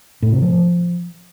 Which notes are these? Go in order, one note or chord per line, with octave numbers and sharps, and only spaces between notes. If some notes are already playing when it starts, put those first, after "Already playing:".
A2
C3
F3